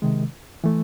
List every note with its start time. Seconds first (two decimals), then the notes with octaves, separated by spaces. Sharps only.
0.02 C3 D#3 G#3
0.64 E3 A3